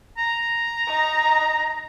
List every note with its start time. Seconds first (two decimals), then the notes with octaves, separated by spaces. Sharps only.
0.18 A#5
0.87 D#4